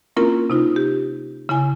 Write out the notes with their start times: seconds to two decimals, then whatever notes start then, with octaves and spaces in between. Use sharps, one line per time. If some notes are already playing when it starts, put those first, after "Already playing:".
0.16 A#3 C4 C#4 E4 F4 A#4
0.50 C3 D#4 F4
0.76 G4
1.49 C#3 E4 G#5